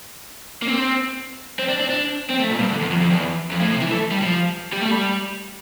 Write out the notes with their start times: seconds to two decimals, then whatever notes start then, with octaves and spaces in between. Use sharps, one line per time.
0.62 A#3
0.67 C4
1.59 C4
1.69 D4
1.79 C4
1.89 D4
2.30 C4
2.40 A3
2.50 A#2
2.60 G2
2.71 D3
2.81 E2
2.90 F2
3.01 F2
3.11 E2
3.51 F2
3.61 A2
3.72 C3
3.82 E3
3.92 A3
4.12 G3
4.22 F3
4.73 G3
4.81 A3
4.91 G3